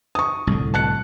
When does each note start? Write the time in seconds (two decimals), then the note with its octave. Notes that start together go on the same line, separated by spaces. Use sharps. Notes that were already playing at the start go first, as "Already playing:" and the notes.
0.15 C#6 D#6
0.47 C2 A2 D3
0.74 A5 F#6 C#7